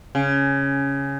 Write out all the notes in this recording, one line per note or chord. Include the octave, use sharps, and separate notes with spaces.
C#3